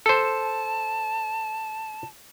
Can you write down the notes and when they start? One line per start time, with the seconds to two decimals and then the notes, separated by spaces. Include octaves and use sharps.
0.06 A4 C5 A5